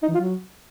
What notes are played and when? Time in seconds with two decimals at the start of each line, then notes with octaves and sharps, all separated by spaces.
0.03 D#4
0.09 E3
0.15 F4
0.20 F#3